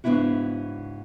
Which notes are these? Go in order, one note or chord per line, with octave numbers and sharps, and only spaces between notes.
G#2 C#3 B3 D4 E4 F#4